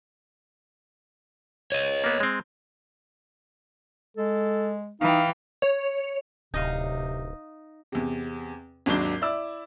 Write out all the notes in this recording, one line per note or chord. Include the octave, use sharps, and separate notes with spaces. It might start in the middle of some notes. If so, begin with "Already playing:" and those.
C#5 D#5
A#3 B3
G#3 C4
G#3 A4
E3 D#4 F5 G5
C#5
D1 C3 D#4 D#5 F5
E2 C3
G#1 D#2 F#3 D4 D6 G7
E4 D5 E6